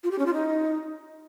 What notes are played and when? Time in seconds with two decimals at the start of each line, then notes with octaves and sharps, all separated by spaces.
0.04 F4
0.11 G4
0.19 C#4
0.26 F4
0.34 D#4